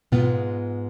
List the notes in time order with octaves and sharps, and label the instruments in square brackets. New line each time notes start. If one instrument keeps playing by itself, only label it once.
[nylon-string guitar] G#2 G#3 B3 F4 [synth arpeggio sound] B2